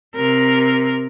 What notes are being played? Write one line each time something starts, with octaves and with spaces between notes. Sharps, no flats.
C3 A#4